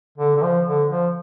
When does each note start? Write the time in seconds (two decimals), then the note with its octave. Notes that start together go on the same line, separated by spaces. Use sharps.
0.18 D3
0.37 D3
0.42 F3
0.67 D3
0.90 F3